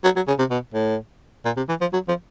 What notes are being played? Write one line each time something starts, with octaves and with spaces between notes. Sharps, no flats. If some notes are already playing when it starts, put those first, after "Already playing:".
F#3
F#3
C#3
C3
B2
A2
A#2
C3
E3
F3
F#3
F3